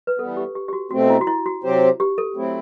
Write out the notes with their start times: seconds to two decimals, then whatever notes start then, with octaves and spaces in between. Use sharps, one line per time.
0.07 B4
0.19 E3 G3 B3 A4
0.37 G4
0.55 G4
0.68 G4
0.73 F#4
0.91 B2 A3 C4 F#4
1.10 E4
1.21 F#4
1.27 E4
1.46 F#4
1.63 C3 F#3 C4 G4 C5
2.00 G4
2.18 A4
2.36 F#3 A3 C4 E4